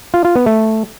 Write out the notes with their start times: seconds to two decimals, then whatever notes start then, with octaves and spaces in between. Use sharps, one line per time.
0.14 F4
0.25 F4
0.36 B3
0.46 A3